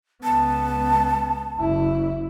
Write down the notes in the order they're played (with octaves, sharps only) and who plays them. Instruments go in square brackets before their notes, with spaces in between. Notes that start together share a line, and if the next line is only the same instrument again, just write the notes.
[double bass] C#2 B3 [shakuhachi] A5
[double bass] F#1 E4